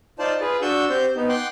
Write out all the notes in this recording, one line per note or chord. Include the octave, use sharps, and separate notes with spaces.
D#4 F4 C5 D5 A5
F4 G#4 B4
D4 F#4 C#6 E6 G6
C4 G4 C5 G6
B3 D#4
F#5 G5 C6 D6 F#6